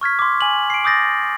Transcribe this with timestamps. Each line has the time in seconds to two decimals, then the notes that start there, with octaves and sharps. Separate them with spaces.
0.01 C#6 F6 G#6 B6
0.19 C6 D6
0.41 G#5 F#7
0.70 C7 D7
0.84 D6 D#6 G6 A6 A#6